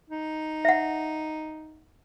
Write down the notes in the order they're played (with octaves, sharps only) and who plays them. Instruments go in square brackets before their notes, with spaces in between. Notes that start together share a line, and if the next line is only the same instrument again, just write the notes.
[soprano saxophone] D#4
[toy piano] E5 F#5